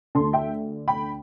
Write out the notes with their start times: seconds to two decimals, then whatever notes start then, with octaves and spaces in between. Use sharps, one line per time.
0.15 D2 D3 A5 C6
0.33 E5 G5
0.88 G5 B5